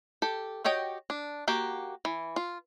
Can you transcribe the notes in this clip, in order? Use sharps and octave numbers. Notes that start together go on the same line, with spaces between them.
G4 A4
F#4 G4 C#5 D#5 G5
D4
A#3 F#4 G4
E3
F4